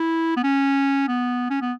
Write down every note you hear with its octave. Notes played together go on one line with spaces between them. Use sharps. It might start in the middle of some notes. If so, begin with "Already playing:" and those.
Already playing: E4
B3
C#4
B3
C#4
B3